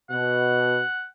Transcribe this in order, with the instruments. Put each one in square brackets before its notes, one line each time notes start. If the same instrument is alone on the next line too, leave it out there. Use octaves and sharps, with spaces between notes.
[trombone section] B2 [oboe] F#5